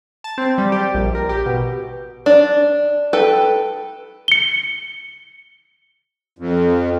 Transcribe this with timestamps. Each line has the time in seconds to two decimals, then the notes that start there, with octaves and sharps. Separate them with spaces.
0.24 A5
0.38 C4
0.58 G3
0.72 G4
0.94 A#1
1.15 A#4
1.29 G4
1.46 B2
2.26 D4
3.13 A4 B4 G5
4.28 C#7 G7
6.39 F2